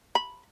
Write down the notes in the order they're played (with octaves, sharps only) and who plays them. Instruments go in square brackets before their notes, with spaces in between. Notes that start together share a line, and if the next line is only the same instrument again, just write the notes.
[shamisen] B5